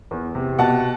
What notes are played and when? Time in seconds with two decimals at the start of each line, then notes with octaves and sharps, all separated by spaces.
0.11 E2
0.35 C3
0.59 B2 F#5 A5